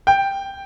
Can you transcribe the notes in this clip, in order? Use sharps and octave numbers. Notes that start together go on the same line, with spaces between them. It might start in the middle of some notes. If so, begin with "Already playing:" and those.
G5